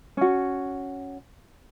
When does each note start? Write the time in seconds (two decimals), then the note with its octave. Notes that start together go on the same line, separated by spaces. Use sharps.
0.17 C#4 F#4